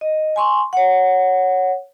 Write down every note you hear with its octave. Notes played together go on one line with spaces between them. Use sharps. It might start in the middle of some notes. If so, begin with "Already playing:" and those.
D#5
G#5 C6 C#6
C#5 F#5